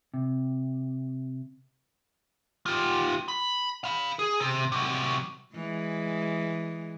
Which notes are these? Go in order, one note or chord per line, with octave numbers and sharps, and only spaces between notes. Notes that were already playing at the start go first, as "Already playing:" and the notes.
C3
F4 G4
B5
F5 B5
G#4
C3
C3 F#3
E3 G#3